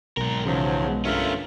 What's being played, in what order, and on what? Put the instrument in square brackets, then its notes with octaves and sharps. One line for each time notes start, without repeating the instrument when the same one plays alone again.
[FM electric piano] B1 [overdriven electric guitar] G#2 A#4
[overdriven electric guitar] E2 [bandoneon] G#2 F3 F#3 [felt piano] C#3
[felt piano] G#3 B3
[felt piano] G1 [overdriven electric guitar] A3 C#4 [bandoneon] F4 A#4 E5